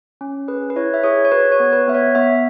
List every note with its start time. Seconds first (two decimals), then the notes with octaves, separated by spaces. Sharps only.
0.21 C#4
0.48 G#4 B4
0.70 B4
0.76 E4 C#5
0.94 E5
1.03 G#4 C#5
1.25 C#5
1.31 F#4 B4
1.52 C#5
1.60 B3
1.73 B4
1.88 B3 E5
1.95 C#5
2.15 B3 E5